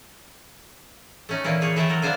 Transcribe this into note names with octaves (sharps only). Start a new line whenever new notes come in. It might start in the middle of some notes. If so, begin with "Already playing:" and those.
A3 C#4 D#4
A#2 E3 A#3 E4
A3 G#4 C#5
E3 A3 E5 G5 A5 A#5
F#3 A4 A#4
A#3 B3 D4 C5 G#5